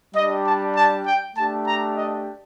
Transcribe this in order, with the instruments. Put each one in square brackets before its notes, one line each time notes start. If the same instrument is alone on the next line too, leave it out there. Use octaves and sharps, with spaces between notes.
[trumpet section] G3 D4 G4 D#5
A5
A5
G5
A3 D4 G4 A5
A#5
D#5